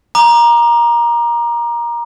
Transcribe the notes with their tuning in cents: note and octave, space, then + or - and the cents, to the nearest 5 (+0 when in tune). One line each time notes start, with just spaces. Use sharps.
A#5 +15 D6 +35